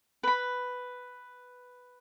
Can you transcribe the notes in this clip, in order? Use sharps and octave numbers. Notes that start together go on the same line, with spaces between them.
B4 B5